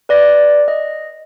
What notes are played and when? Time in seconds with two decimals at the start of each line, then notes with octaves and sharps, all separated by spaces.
0.09 B4 D5 A#6
0.68 D#5